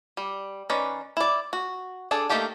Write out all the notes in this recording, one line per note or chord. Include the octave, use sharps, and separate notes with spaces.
G3
D#3 C#4 B4 D5
E4 D5
F#4
D4 G#4 A4
A3 A#3 D#4 G4 A4